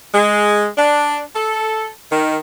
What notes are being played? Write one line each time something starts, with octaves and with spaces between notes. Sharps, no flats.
G#3
D4
A4
D#3